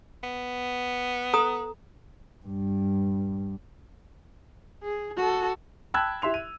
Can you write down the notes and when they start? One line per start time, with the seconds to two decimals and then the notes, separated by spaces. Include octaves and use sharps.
0.24 B3
1.34 A4 A#5 D#6
2.46 G2
4.83 G#4
5.17 F#4 A4
5.94 G5 A5 B5 E6 F#6 G#6
6.22 E4 G4 E5 C6 F7
6.34 D#7